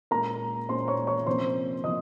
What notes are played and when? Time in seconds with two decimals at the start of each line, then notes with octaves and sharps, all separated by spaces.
0.11 A#2 G#3 C#4 A#4 A#5
0.69 A#2 G#3 C#4 C5 C6
0.88 C#5 C#6
1.07 C#5 C#6
1.27 C3 F3 A#3 C#4 C5 C6
1.84 C3 F3 A#3 D#5 D#6